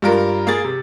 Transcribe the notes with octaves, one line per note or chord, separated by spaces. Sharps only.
G2 F4 A#4
A#3 G#4 A6
C3